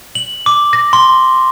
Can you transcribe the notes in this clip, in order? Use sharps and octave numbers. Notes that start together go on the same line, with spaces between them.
F#7
D6
A#6
C6